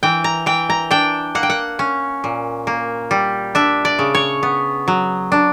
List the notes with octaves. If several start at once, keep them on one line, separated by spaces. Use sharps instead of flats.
E3 G5
A#5
E3 G5
A#5
D4 G5
A#3 F#5
G5
F#5
C#4
A#2
A#3
G3
D4 E5
D5
C#3
C#5
B3
F#3
D4